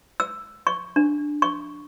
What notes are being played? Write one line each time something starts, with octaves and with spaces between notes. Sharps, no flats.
E6
C#6
D4
C#6